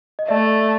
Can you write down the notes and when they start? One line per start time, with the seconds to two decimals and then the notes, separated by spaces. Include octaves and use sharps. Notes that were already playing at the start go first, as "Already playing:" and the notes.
0.19 D#5
0.28 A3 D5 E5